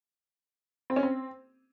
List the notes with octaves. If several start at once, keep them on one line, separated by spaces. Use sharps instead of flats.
C4
C#4
C4